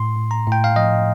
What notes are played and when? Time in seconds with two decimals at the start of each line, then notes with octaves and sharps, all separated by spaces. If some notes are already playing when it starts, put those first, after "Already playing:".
Already playing: A2 C6
0.16 A2
0.31 A#5
0.47 A2
0.52 G5
0.64 F5
0.76 F3 D#5